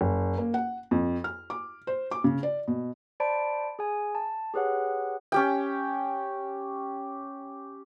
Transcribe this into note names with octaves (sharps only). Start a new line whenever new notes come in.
F#1
A#3
F#5
F2
F6
D6
C5
D6
C#3
D5
B2
C5 D5 A5 B5 D7
G#4 G#5
A5
G4 G#4 B4 C#5 F#5
C#4 G4 G5